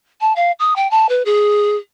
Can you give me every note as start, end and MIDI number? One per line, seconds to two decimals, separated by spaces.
0.21 0.33 81
0.36 0.51 77
0.59 0.76 87
0.76 0.89 79
0.91 1.09 81
1.09 1.22 71
1.25 1.76 68